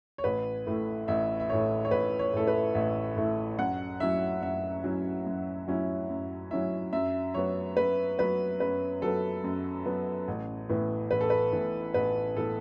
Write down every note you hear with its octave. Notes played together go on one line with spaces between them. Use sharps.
C#5
A1 B4
A2 A3 E4
A1 E5
E5
A2 A3 E4 C#5
C#5
A1 B4
C#5
A2 A3 E4 A4
B4
A1 E5
A2 A3 E4
F#2 F#5
F#3 C#4 E4 E5
F#2 E5
F#3 C#4 E4
F#2
F#3 C#4 E4
F#2
F#3 C#4 E4 E5
F#2 E5
F#3 B3 C#5
F#2 B4
F#3 B3 B4
F#2 B4
F#3 B3 A4
F#2
F#3 B3
A1
A2 E3 B3
A1 B4
A4
B4
A2 E3 B3
A1 B4
A2 E3 B3 A4